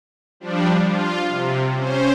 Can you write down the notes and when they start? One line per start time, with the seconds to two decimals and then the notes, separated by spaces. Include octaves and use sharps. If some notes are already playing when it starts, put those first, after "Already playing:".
0.40 F3 G3 D4
0.83 F4
1.28 C3
1.75 C#4 C5